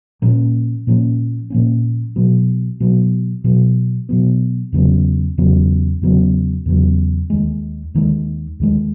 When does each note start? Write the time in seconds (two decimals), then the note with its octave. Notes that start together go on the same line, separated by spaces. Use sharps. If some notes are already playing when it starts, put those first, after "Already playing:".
0.22 A#2 F3 A#3 C#4
0.87 A#2 F3 A#3 C#4
1.50 A#2 F3 A#3 C#4
2.16 B2 F#3 B3
2.80 B2 F#3 B3
3.44 B2 F#3 B3
4.09 B2 F#3 B3
4.72 E2 C#3 F#3 B3
5.38 E2 C#3 F#3 B3
6.02 E2 C#3 F#3 B3
6.66 E2 C#3 F#3 B3
7.30 D#2 D#3 G#3
7.94 D#2 D#3 G#3
8.60 D#2 D#3 G#3